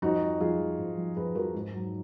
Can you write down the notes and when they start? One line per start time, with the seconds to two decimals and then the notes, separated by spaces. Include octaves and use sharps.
0.02 F2 D#4 F#4
0.21 F3
0.40 F2 F4 G#4
0.59 F3
0.79 F2
0.97 F3
1.16 F2 G#4 B4
1.35 F3 F#4 A#4
1.54 G#2
1.74 F#3